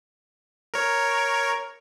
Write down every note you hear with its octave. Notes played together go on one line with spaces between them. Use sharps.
A#4 C#5